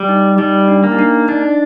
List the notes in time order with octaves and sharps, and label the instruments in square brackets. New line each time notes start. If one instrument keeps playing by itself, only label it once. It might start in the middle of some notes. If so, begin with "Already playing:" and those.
Already playing: [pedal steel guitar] G3
[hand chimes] D#4
[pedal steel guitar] G3 [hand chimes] D#4
[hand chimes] D4
[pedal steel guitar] A#3
[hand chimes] D#4
D4
[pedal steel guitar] D4 [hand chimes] D#4